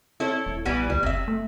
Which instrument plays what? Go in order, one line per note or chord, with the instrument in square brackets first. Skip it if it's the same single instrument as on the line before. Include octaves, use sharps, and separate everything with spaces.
[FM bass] C4 [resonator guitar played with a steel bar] E4 A4 C#5
[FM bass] D#1
[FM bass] A#1 [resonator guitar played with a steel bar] E3 G3 B3
[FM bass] D2 [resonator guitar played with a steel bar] G3
[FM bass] F#1 [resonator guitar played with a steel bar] C3 E5
[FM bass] A3